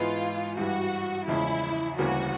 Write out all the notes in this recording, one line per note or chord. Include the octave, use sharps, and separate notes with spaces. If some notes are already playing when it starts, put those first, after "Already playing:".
Already playing: G#2 E3 G#3 B3 F4
G2 E3 G3 F#4
E2 C#3 F3 G#3 E4
D2 C#3 E3 G3 A#3 F#4